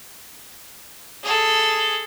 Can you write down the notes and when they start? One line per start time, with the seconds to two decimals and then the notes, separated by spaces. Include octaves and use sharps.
1.23 G#4 A4